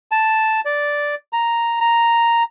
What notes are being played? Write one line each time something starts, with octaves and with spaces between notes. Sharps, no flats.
A5
D5
A#5
A#5